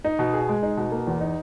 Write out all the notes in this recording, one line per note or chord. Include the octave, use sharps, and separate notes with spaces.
D#4
B2
G#4
G#3
D#4
B2
A#3
E2
D#4